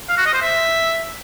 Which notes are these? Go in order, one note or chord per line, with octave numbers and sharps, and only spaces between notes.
F5
F#4
D#5
C5
E5